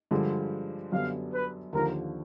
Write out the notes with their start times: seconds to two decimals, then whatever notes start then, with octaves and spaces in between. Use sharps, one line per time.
0.11 G2 D3 F3 G#3
0.92 F#2 D3 G3 B3 F5
1.32 B4
1.73 D#2 D3 F3 A#4